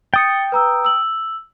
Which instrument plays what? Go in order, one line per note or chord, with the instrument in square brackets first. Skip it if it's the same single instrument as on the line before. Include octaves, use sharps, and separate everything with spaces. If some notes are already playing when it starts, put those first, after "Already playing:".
[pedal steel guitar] G5 D#6 [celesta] A6 C#7
[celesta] B4 A#5 E6
E6 F#7